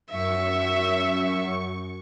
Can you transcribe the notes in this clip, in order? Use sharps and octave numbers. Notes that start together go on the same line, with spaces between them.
F#2 E5 C#6